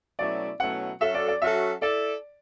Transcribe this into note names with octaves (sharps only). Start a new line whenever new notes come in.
B2 F#3 A3 C#4 E4 D5
B2 F#3 A3 C#4 E4 F#5
F#3 C#4 F#4 A4 E5
D5
D5
F#3 C#4 F#4 A4 E5
E4 A4 D5